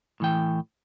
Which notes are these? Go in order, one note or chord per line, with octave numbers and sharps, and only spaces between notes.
A2 E3 G5